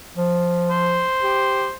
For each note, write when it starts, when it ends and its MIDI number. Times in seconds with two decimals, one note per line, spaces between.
0.16 1.04 53
0.70 1.77 72
1.22 1.68 67